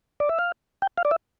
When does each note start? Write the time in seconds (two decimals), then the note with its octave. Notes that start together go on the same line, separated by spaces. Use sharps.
0.20 D5
0.29 E5
0.39 F5
0.82 G5
0.98 F5
1.05 D5
1.11 E5